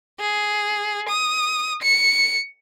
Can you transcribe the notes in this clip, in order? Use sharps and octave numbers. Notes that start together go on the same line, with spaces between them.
G#4
D#6
C#7